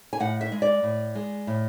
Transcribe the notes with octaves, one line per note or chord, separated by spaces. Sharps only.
G#5
A2 F#5
E5
G#3
D5
A2
G#3
A2